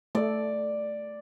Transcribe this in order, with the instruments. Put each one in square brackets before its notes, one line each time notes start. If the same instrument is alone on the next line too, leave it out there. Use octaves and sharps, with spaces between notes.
[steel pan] A3 A4 [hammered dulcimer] D5